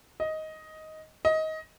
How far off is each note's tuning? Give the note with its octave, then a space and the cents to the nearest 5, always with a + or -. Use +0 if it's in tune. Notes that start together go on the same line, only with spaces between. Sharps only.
D#5 +10
D#5 +20